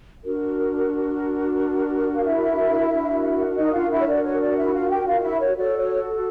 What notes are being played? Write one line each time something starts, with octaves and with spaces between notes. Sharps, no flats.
D4 F#4 A#4
F5
E4 E5
D4 F#4 A#4
D#4 D#5
F4 F5
E4 E5
C#5
D5
C#5
D5
E4 E5
F4 F5
G4 G5
F4 F5
D#5
E4 E5
C#5
F#4 A4 C#5 D5
C#5